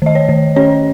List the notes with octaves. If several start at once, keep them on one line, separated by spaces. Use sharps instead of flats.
D#3 D#5
C#5
D#3
C#4 C#5